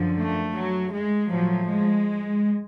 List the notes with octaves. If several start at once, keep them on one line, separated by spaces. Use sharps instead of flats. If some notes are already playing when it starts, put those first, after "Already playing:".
Already playing: F#2 D3 F3
A3
F#3
G#3
A2 F3 F#3
G#3